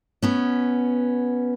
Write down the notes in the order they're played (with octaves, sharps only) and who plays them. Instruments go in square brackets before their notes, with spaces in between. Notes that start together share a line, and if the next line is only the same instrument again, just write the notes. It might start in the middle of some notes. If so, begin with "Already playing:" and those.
[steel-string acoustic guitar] B2 B3 C#4